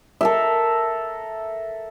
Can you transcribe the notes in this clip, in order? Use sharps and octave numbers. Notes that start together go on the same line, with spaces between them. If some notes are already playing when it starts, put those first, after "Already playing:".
A4 A#4 E5